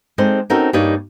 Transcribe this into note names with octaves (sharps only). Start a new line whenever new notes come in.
G#3 C4 D#4 A4 C5 D5
C4 C#4 D#4 F#4 A4 A#4
G2 G3 A#3 D#4 C#5 D5